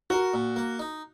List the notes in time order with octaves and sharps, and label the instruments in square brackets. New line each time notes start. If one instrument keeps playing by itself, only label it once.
[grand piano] F#4 [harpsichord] A#4
[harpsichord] A#2
A#3
D#4